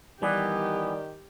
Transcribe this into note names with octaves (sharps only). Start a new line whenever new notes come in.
D#3 E3 G3 B3 G4 D5